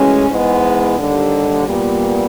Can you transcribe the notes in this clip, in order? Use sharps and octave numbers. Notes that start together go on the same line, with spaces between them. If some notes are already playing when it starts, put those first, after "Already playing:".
Already playing: A2 E3 G#3 C#4 F#4
G#2 E3 G#3 B3
D#2 D3 G3
A#2 G3 B3